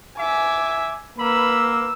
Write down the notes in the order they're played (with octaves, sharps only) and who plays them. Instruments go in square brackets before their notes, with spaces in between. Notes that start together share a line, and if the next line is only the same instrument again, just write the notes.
[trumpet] E5 [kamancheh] G#5 D6
[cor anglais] A#3 [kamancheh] B4 E6 [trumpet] B5